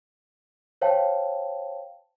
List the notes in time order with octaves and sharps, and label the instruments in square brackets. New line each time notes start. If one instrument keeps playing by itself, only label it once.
[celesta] C5 C#5 F5 G5 A5